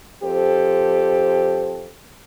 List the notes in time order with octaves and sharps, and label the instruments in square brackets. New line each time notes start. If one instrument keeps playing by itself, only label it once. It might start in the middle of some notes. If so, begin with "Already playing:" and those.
[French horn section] F2 G4 A4 C5